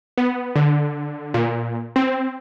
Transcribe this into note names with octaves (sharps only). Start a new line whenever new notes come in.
B3
D3
A#2
C4